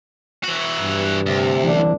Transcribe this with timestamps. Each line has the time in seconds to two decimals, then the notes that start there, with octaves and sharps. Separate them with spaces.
0.44 E3 F#4
0.80 G2
1.26 D2 C3
1.64 F#1 C2 E3 D4